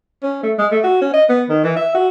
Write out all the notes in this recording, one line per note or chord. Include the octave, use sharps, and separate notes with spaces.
C#4
A3
G#3
A3
F#4
C#4
D#5
B3
D#3
E3
E5
F#4